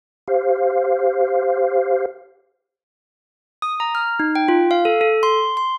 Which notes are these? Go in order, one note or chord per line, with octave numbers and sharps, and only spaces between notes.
G4 C5 F5
D#6
A#5
F6
D#4
G5
F4
F5
A4
A4
C6
C6